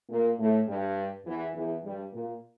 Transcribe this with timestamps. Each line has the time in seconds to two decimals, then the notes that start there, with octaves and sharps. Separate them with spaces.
0.09 A#2 A#3
0.38 A2 A3
0.67 G2 G3
1.25 E2 E3
1.54 E2 E3
1.83 G2 G3
2.12 A#2 A#3